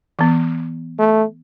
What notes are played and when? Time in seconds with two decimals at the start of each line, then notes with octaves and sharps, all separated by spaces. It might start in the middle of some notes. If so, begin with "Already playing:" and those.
0.19 E3 B3
0.99 A3